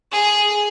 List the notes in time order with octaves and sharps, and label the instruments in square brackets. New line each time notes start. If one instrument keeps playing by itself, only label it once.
[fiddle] G#4